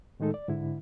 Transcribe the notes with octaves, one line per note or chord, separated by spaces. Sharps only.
A2 D#3 G#3 D#4 A4
D5
G#2 D3 E4